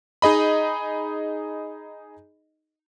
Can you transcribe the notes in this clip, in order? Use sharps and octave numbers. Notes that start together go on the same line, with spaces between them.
D#4 G#4 D#5 B5